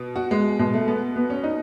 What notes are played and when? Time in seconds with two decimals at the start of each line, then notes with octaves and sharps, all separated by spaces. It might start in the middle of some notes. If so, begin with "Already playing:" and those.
Already playing: B2
0.16 F#4
0.31 G#3
0.59 B2 G#3
0.73 A3
0.88 B3
1.16 B3
1.30 C#4
1.44 D#4